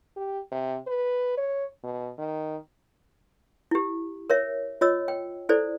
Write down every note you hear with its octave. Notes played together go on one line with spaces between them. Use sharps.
G4
C3
B4
C#5
B2
D#3
E4 G4
A#4 C#5 E5
F4 C#5 D#5 E6
G5
E4 A4 C5 D5